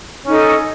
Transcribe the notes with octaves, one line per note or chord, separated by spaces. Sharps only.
C#4 D#4 A4